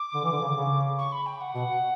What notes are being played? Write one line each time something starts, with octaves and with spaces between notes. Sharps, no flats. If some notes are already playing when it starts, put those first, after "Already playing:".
Already playing: D6
D3
E3
D3
C#3
D3
C#3
C#6
B5
G5
F#5
B2 F#5